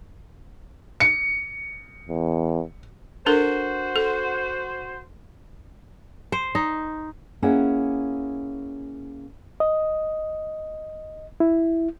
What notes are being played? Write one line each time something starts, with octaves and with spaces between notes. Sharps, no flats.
C#7
E2
D4 F#4 A4 A#4 C5
A4
C5
D#4
A#3 C#4 E4 G#4 C#5 F#5
D#5
E4